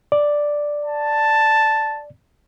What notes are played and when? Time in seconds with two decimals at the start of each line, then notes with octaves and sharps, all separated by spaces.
0.12 D5
0.85 A5